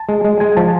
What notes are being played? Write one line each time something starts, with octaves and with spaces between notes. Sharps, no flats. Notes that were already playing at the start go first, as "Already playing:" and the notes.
Already playing: A5
G#3
G#3
G#3 G#5
F3 A5